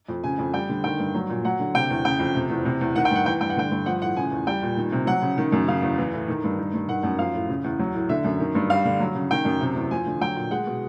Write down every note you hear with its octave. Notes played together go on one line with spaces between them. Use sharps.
F2
C#3 G#5
F2
G3 G5
D3
D#3 G5
G2
F#3
A#2
F#3 F#5
D3
C3 G5
E2
C#3 G5
F2
C3
E2
C3
E2
D#3 F#5
G5
G2 F#5
E3 G5
G2 G5
F#5
D3 G5
G2
F3 F#5
A2 F#5
C#3 G#5
E2
G3 G5
A#2
D#3
C3
F#3 F#5
C#3
D#3
F#2
C#3 F5
E2
E3
A2
D#3
G2
D#3
G2
D#3 F#5
F#2
F3 F5
A2
C#3
E2
F#3
A2
D3 E5
F#2
D#3
G2
G3 F5
D3
F#3
C#3
D#3 G5
F#2
C3
E2
F3 G#5
D3
F#3 G5
A#2
G#3 F#5
B2